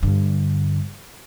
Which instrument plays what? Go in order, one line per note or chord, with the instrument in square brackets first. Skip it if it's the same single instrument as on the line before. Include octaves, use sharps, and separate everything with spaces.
[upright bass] G2 D3